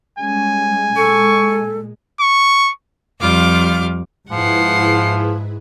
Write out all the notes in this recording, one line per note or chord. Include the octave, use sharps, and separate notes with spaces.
G3 G#3 C#4 G#5
A#2 G#3 A4 C#6
C#6
F2 G3 F4 D6 F6
G#2 F3 E4 G#4 B4 F#5 C7